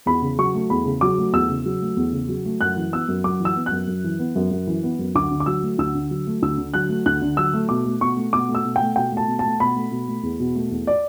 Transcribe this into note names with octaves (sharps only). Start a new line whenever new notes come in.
E2 B5
C#3
F#3 C#6
A3
E2 B5
C#3
F#3 D6
A3
E2 E6
C#3
F#3
A3
E2
C#3
F#3
A3
F#2 F#6
E3
B3 E6
F#2
F#2 D6
E3
E6
B3
F#6
F#2
F#2
E3
B3
F#2
F#2
E3
B3
F#2
D2 D6
D3
D6
F#3 E6
A3
D2 E6
D3
F#3
A3
D2 E6
D3
F#3 F#6
A3
D2 F#6
D3
F#3 E6
A3
B2 D6
A3
B2 C#6
A3
B2 D6
A3
E6
B2
A3 G5
B2 G5
A3 A5
B2
A3 A5
B2 B5
A3
B2
A3
E2
B2
A3
E2
D5